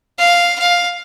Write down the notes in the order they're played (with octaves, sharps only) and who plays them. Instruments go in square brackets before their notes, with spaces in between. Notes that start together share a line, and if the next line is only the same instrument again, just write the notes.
[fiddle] F5
F5